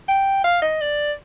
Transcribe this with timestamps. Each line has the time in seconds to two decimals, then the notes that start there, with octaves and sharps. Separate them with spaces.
0.08 G5
0.44 F5
0.62 D#5
0.81 D5